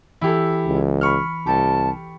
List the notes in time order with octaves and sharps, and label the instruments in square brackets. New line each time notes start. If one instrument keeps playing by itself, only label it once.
[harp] E3 [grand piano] E4 G4 A4
[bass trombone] C#2
[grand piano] B5 C#6 F6
[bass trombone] C2 [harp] G4 A4 G5 [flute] A5